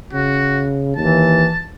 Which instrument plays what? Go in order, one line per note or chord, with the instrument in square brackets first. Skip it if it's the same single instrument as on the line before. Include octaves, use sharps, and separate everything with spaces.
[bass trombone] C#3 [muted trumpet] F#4
[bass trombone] D#2 [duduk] E3 [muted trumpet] A5